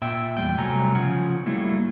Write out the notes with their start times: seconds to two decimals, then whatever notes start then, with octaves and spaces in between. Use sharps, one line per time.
0.02 A#2 E5 G5
0.37 E2 G3 G5
0.58 C3 F#3 G3 A3 G#5 A#5
0.95 C#3 F3 F#5 G#5
1.46 F#3 G3 A3 A#3 E4